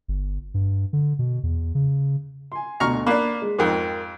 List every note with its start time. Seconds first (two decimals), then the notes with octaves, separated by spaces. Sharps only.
0.08 G1
0.54 G2
0.93 D3
1.19 B2
1.43 E2
1.75 C#3
2.52 G#5 C6
2.80 D2 B2 A#5 C#6 F6
3.06 A#3 D4 B5 F#6 B6
3.42 G#3
3.59 F2 G#2 A#4 G5